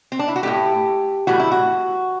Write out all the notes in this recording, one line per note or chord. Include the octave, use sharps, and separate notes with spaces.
C4
D4
E4
F#4
A2 E3 A3 G4
A2 E3 G3 F#4
E4
F#4